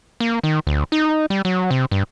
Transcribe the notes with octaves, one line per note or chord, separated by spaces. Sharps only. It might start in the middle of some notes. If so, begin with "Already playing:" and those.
A#3
D#3
D2
D#4
G3
F#3
C3
G2